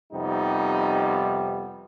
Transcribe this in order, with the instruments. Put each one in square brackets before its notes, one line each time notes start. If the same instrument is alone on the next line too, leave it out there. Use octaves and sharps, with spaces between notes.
[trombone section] F2 C3 G3 B3 D#4